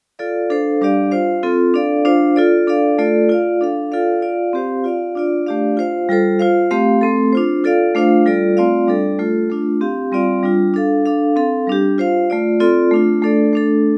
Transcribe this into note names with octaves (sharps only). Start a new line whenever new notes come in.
F4 A4 D5 F5
D4 A4 C5 F5
G3 D4 G4 D5 F5
F4 C5 F5
C4 F4 A4
D4 A4 D5 F5
D4 F4 C5 F5
F4 A4 D5
D4 A4 D5 F5
A3 F4 A4 D5
F4 D5 F5
D4 A4 F5
F4 A4 D5 F5
F4 D5 F5
C4 G4 C5 F5
F4 D5 F5
D4 F4 D5
A3 D4 G4 D5 F5
F4 C5 F5
G3 F4 A4 C5
F4 C5 F5
A3 C4 G4 F5
A3 C4 A4
D4 F4 C5
F4 A4 D5 F5
A3 D4 F4 C5 F5
G3 F4 A4 D5
A3 C4 F4 D5 F5
G3 D4 A4 D5
A3 F4 A4
A3 D4 F4
C4 G4 F5
G3 C4 F4 D5 F5
G3 D4 F4
D4 A4 F5
D4 A4 F5
C4 A4 F5
G3 D4 G4
F4 C5 F5
A3 F4 D5
C4 F4 A4 D5
A3 D4 F4
A3 D4 A4 D5
A3 D4 A4